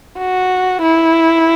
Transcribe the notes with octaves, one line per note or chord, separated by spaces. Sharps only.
F#4
E4